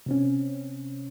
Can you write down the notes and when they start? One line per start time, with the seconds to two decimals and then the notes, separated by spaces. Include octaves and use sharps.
0.06 C3 C4 C#4